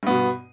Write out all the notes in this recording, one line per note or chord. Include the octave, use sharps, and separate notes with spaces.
G2 B2 B3